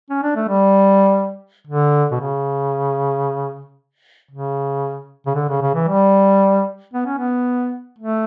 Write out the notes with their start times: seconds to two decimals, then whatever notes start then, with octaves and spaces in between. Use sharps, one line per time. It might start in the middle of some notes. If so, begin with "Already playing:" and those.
0.10 C#4
0.23 D4
0.36 A3
0.49 G3
1.67 D3
2.11 B2
2.20 C#3
4.31 C#3
5.26 C#3
5.35 D3
5.49 C#3
5.62 C#3
5.75 E3
5.88 G3
6.94 B3
7.06 C#4
7.18 B3
7.98 A3